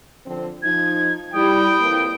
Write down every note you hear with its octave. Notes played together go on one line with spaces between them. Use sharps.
D3 F3 C4
F3 D#4 G#6
G3 E4 G5 D#6
F2 A#3 B4